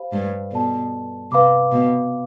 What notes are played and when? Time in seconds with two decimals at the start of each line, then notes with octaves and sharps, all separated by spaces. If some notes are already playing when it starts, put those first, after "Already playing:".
Already playing: G4 C5 F5 B5
0.12 G2
0.51 B2 A4 D5 A5
1.31 C3 B4 F5 B5 D6
1.72 B2